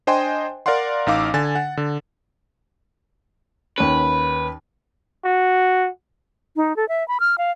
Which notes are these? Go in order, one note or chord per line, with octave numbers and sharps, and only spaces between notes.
D4 C5 D#5 G5 G#5 C6
A#4 D5 F5 F#5 C6
A1 D#4 F5 D6 E6
D3 G#5 A6
F#5
D3
D#2 C#4 B4
F#4
D#4
A4
E5
B5
F6
F5